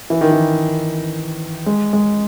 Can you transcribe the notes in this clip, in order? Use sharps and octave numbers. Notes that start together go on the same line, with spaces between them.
E3
D#3
E3
G#3
G#3